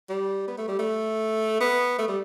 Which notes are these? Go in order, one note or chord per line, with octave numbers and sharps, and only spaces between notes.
G3
B3
A3
G3
A3
B3
A3
G3